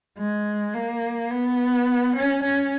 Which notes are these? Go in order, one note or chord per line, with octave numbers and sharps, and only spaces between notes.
G#3
A#3
B3
C#4
C#4